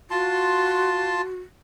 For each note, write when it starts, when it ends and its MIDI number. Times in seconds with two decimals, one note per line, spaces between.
0.11 1.21 65
0.11 1.39 66
0.11 1.21 81
0.11 1.21 84